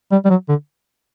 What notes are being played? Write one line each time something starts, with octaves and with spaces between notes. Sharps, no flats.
G3
G3
F#3
D3